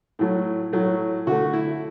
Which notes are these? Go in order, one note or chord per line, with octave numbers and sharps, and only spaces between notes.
A2 F#3 A3
A2 F#3 A3
D3 A3 F#4
E4